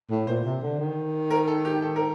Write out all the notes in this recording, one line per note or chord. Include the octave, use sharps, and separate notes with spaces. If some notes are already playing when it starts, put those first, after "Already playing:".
A2
A#2 C5
C3
D3
D#3
A#4
A4
G4
A4
A#4